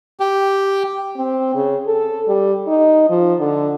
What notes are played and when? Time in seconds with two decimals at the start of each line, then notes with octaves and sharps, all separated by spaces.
0.20 G4
1.17 C4
1.55 C#3
1.86 A4
2.28 G3
2.67 D#4
3.10 F3
3.39 D3